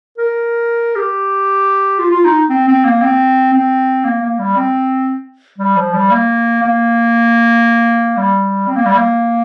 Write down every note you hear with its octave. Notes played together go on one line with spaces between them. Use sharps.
A#4
G4
F4
F4
D#4
C4
C4
A#3
C4
C4
A#3
A#3
G3
C4
G3
F3
G3
A#3
A#3
G3
C4
A#3
G3
A#3